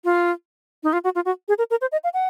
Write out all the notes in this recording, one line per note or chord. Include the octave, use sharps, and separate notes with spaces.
F4
D#4
F4
F#4
F4
F#4
G#4
A#4
A#4
C5
D#5
F5
F#5